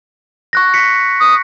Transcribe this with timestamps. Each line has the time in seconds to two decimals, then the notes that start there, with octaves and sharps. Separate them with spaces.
0.53 C#6 F#6 A#6
0.74 B6 C#7
1.20 D#6